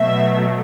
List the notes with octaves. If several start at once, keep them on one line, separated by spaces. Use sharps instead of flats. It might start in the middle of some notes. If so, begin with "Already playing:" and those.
Already playing: B2 F#3 A3 E5